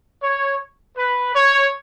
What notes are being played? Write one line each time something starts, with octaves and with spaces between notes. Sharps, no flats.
C#5
B4
C#5